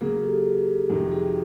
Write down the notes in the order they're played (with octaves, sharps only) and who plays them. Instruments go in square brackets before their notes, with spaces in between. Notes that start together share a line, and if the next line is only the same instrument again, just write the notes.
[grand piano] C#3 F#3 A#3 [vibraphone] F#4 G#4
[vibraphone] G4 A4
[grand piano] F2 C3 D#3 G#3 C#4
[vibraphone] F#4 G#4